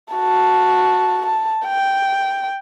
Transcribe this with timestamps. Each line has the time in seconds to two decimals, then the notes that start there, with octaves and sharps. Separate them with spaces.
0.14 F#4 A5
1.26 A5
1.66 G5